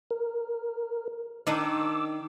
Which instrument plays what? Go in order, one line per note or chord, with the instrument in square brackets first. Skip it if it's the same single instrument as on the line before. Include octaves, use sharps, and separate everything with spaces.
[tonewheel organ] A#4
[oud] D#3 D4 D#4 [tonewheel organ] D6 E6